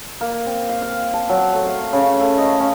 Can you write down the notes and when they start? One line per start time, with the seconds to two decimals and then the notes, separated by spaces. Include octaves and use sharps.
0.21 A#3
0.46 C4
0.69 F5
0.82 F5
1.14 A5
1.29 F#3
1.52 A3
1.66 F5
1.93 C#3
2.20 A3
2.38 D#5
2.60 C#4